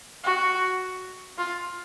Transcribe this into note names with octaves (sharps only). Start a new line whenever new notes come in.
F#4
F4